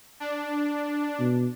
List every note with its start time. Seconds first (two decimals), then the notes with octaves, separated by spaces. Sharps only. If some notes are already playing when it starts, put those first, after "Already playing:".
0.20 D4
1.20 B2